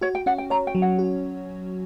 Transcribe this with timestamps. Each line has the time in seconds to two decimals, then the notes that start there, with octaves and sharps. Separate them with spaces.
0.01 F#4 C#5
0.15 G5
0.26 C#4 F#5
0.38 G5
0.50 C#5 A#5
0.67 G5
0.75 F#3
0.82 F#5
0.99 F#4